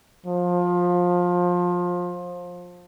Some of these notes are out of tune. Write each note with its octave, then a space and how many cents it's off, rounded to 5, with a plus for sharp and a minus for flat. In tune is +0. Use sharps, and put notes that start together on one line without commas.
F3 +20